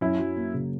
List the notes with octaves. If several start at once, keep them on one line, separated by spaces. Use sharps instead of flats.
F#2 C#4 E4
F#3
A#3
C#3